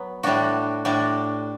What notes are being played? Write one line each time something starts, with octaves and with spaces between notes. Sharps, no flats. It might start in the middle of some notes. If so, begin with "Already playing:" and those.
Already playing: F#3 B3
A2 G3 D4 F#4
A2 G3 D4 F#4